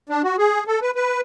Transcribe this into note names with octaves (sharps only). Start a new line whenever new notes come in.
D4
F#4
G#4
A4
B4
B4